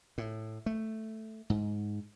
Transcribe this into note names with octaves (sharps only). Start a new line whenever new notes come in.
A2
A3
G#2